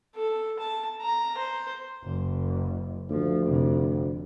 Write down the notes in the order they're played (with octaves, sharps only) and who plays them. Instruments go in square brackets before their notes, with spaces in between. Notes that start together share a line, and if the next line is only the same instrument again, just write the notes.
[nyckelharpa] A4
A5
A#5
C5
[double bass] F#1
[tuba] D2 [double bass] F3
[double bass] F1 C3